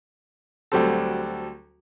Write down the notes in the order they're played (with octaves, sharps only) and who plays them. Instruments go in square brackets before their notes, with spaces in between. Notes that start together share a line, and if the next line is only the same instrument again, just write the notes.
[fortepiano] D2 F#3 G3 C4 A4